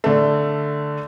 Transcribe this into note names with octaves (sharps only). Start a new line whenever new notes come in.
D3 A3